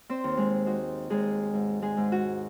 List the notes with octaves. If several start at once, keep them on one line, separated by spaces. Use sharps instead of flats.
C4 C5
D#2
G#3 G#4
D#4 F#4
D#2 G#3 G#4
G#2
G#3 G#4
G#2
F#4